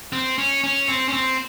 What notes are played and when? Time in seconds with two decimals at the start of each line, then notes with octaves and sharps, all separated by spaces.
0.13 C4
0.38 C#4
0.64 C#4
0.89 C4
1.08 C#4
1.13 C4